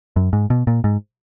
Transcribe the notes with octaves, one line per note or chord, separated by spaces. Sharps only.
F#2
G#2
B2
A#2
G#2